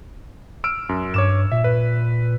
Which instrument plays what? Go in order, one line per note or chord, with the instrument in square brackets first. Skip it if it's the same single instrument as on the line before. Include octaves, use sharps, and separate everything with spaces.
[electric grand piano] E6 F6 D7
F#2
[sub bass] G2 [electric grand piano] C#5 D6 E7
[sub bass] A#2 [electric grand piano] E5
[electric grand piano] B4